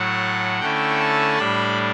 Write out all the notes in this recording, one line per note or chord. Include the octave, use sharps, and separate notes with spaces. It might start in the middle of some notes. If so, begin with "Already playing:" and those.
Already playing: A2 F#3 A3 F#5
D3 A3 C#4 E4 G5
A5
A2 G3 D4 B5